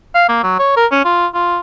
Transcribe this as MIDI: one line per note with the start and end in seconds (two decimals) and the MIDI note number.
0.15 0.24 77
0.29 0.42 58
0.43 0.57 54
0.59 0.73 73
0.77 0.86 70
0.92 1.03 61
1.05 1.27 65
1.34 1.60 65